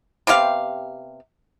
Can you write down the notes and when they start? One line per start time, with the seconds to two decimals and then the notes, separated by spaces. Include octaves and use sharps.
0.27 C3 B3 G4 F5